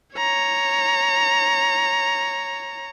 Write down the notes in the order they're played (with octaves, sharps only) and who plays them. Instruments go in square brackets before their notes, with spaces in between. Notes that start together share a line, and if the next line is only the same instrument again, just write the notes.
[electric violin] C#5 A#5